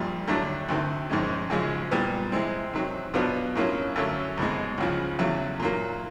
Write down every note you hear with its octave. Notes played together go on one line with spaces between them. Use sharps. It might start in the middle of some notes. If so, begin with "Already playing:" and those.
Already playing: A#1 A#2 G3
D#2 D3 F#3 A3 D4
D2 C3 D#3
A#1 G#2 D#3 G#3 C#4
F#2 C#3 F3 G#3
A#2 G3 B3
C3 E3 G#3 C4
C3 D#3 F#3
B2 F#3 B3 D4 F4
A2 F#3 A#3 C#4 F4
F#2 D3 F#3 A3 C#4
C2 B2 G#3
C#2 C#3 F3
E2 C#3 F#3 A3
A#2 F#3 A#3